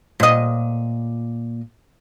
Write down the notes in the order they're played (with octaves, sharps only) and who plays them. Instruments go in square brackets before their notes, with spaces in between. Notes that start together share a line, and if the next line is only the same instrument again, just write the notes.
[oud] A#2 D#5